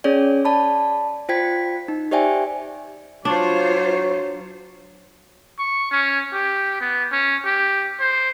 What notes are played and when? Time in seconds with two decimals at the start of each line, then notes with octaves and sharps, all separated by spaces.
0.04 C#4 G#4 C#5 D5
0.45 D5 A5 B5
1.29 F4 C5 G5 G#6 B6
1.88 D#4
2.11 G4 C5 D5 E5 G5 G#5
3.25 F#3 D4 F4 C5 C#5
5.59 C#6
5.91 C#4
6.33 G4
6.81 B3
7.12 C#4
7.45 G4
8.00 C5